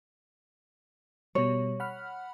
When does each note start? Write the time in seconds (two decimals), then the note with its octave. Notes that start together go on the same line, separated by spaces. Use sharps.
1.35 B2 G3 C#5
1.80 F#5 B5 F6